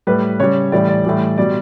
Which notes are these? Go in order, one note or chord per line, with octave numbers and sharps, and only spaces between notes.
A2 G3 B4
C#3 G3 C#5
A2 E3 G3 D5
D5
A2 E3 G3
B2 G3 D5